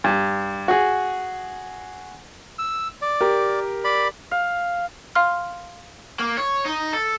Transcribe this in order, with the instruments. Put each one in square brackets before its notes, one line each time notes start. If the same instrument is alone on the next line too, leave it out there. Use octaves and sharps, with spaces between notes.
[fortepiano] G2
F#4 G#4
[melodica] E6
D5
[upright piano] G4 A#4
[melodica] D5 B5
[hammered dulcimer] F5
[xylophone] F5 C6 F6
[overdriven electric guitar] A#3
C#5
D#4
A4